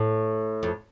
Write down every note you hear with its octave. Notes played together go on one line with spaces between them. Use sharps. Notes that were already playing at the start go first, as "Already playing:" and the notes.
Already playing: A2
F2